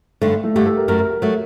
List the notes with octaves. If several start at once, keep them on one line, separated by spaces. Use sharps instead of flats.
G2 D3 A3
A3
G2 D3 A3 G4
A4
A#4
F#2 F#3 A3 A#4
A#4
A#4
F#3 A3